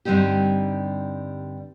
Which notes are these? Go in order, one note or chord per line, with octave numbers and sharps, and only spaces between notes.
G2 D3 G3 C4 D#4 G4